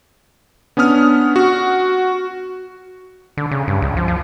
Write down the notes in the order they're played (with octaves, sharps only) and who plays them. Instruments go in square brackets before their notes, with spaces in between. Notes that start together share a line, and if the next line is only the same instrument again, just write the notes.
[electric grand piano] B3 C#4 D4 D#6 F6
F#4
[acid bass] D3
C#3
G2
C#2
F3
F3